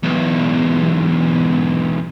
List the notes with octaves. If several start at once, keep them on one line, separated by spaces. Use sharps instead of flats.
B1 E2